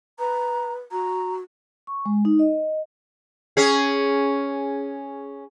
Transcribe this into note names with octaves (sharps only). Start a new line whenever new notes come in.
B4 A#5
F#4 A#5
C#6
G#3
D#4
D#5
C#4 G#4